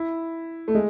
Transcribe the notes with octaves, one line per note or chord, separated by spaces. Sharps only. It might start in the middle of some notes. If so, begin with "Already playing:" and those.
Already playing: E4
A3
G#3